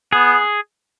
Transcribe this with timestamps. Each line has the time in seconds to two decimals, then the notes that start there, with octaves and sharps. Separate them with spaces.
0.12 B3 G#4